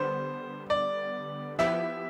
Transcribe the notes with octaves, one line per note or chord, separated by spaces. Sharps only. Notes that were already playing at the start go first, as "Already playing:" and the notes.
Already playing: D3 G3 B3 C5
D5
F3 B3 E4 G4 E5